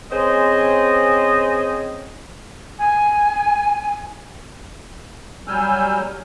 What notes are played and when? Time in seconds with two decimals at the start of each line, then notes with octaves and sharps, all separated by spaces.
0.12 C4 C#4 G#4 C5 D#5
2.79 G#5
5.48 F#3 G3 G#5 E6 F6 G6